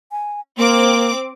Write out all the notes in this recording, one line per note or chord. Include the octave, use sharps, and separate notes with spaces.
G#5
A#3 C4 D6